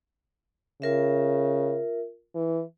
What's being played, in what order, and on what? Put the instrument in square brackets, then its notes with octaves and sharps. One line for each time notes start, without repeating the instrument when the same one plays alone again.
[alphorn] C#3 [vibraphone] F4 A#4 E5
[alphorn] E3